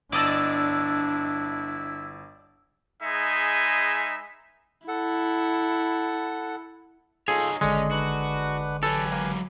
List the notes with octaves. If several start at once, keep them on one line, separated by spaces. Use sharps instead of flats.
G1 D4 E4 D5 D#5 A5 E6
G#3 D#4 G#4 B4 E5 G#5
E4 A4 F#5
D#4 F4 G#4 A4 C#5
G#1 D3 G#3 C#4 D4 D5 D#5
D4 F#4 B4 F#5
F#3 G4 A4 B4 G#5
A#3